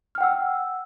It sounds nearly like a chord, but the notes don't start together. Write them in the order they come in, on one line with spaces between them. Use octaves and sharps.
F6 G5 F#5 E6